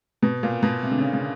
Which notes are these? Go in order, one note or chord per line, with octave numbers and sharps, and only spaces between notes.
B2
A#2
B2
C3
D3
C#3
C#3